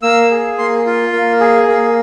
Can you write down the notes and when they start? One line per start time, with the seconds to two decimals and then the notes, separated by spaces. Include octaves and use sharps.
0.03 A#3 E6
0.31 G#4
0.58 A#3 C6
0.86 F4
1.12 A#3
1.40 G#4
1.68 A#3